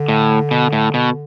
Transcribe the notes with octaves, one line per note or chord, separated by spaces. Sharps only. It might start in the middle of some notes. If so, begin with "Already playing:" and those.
Already playing: D3
A2
B2
A2
B2